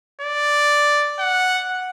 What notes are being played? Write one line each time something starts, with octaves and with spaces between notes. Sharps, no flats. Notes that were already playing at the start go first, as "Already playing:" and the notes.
D5
F#5